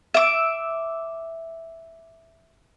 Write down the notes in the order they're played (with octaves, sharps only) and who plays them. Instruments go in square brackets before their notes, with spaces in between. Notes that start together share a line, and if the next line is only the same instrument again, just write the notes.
[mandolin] E5 D6